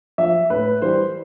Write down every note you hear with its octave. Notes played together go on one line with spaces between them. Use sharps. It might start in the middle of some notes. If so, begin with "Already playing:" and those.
F3 E5
A2 B4
E3 G3 C5